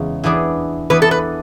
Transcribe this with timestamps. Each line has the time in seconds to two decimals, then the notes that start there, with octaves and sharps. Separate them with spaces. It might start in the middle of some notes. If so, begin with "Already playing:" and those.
Already playing: E2 C#3 G#3
0.24 E3 B3 D4 G#4 D5
0.90 E3 B3 D4 G#4 B4 D5
1.02 A4
1.11 B4